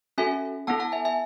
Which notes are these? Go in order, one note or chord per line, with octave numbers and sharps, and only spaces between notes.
C#4 F#4 A4 E5 G#5
B3 E4 A4 F#5 A5
F#5 A5
E5 G#5
E5 G#5